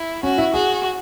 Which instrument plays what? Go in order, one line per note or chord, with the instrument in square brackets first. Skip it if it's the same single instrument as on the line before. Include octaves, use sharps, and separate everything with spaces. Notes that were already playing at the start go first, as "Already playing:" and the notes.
Already playing: [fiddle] E4
[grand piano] C#4 [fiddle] F#4
[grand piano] E4
[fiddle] F#4 [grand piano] G#4